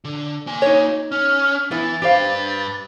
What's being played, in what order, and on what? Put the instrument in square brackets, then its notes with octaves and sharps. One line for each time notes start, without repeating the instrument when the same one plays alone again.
[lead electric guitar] D3
A#3 G#5
[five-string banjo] D#4 C#5
[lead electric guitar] C#4 [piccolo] F6
[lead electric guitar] E3 [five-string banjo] B3 E4 [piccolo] A6
[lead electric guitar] G2 B4 [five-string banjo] G4 C5 F5